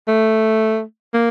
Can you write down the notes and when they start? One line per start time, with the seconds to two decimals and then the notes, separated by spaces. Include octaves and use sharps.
0.08 A3
1.14 A#3